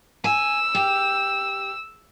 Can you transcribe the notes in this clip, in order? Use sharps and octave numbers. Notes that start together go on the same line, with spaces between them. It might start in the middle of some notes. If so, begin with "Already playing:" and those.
G#5 E6
G4